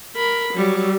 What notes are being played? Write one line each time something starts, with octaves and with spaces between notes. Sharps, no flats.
A#4 B5
F#3 G3